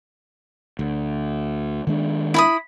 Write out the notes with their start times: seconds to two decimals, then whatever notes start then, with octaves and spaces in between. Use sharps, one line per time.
0.79 D2
1.87 D#3 G#3 D4
2.34 E4 B5 D#6